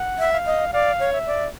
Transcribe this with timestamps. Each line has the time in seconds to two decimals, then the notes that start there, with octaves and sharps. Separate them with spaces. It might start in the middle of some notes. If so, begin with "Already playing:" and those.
Already playing: F#5
0.19 E5
0.33 F5
0.46 D#5
0.73 D5 F5
1.00 C#5
1.13 E5
1.27 D5